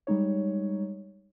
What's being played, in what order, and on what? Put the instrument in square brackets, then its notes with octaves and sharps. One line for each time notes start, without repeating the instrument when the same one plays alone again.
[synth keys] G3 G#3 D#4 C#5